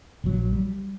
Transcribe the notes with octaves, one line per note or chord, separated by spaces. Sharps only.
A#1 F#3
G3